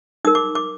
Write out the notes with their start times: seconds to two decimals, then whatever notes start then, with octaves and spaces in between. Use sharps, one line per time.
0.25 D#4 A#4 D#6
0.35 D6
0.55 D6